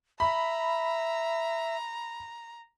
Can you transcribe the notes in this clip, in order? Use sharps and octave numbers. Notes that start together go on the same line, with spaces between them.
E5 A#5 B5